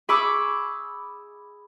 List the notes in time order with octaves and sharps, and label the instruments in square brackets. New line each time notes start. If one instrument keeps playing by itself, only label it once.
[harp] G#4 B5 C#6 D6 E6